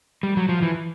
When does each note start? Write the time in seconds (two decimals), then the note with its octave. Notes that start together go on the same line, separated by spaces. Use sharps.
0.23 G3
0.37 F#3
0.49 F3
0.62 E3